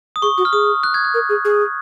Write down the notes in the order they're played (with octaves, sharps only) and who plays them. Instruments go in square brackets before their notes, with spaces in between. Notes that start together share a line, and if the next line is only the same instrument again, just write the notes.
[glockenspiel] D#6
[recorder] G#4 [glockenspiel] C#6
[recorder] F#4 [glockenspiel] D#6
[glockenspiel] F6
[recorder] G#4 [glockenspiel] D#6
[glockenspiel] F#6
G#6
F#6
[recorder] A#4
G#4
G#4